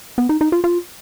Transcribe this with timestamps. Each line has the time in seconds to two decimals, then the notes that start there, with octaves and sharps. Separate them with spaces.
0.18 B3
0.29 D#4
0.41 D#4
0.52 F4
0.64 F4